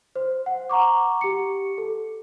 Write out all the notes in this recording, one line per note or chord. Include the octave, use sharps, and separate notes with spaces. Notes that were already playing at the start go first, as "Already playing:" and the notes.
C5
F#5
F#5 A#5 C#6 D6
G4 C#7
A4